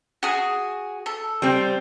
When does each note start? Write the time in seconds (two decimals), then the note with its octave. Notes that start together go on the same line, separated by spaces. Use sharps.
0.23 F#4 G#4
1.06 A4
1.42 G3 C4